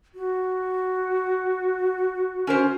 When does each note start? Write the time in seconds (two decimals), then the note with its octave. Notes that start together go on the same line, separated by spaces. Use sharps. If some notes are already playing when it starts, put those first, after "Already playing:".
0.15 F#4
2.47 C#4 A#4 C5